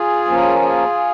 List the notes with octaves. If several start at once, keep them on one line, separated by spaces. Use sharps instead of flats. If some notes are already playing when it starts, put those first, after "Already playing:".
Already playing: F4 G#4
F3 A#3 C#4
F4 G#4